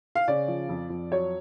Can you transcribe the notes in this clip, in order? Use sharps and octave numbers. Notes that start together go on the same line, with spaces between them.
F5
C#3 D5
F3
F2
F2
F#3 C#5